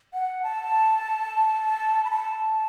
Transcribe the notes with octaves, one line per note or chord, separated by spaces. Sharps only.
F#5
A5
B5
A5